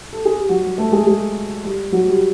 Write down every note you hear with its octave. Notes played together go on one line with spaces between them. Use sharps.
A4
G#4
G4
F#3 F#4
G3 G4
A3 A4
G#3 G#4
G#3 G#4
G3 G4
F#3 F#4
G3 G4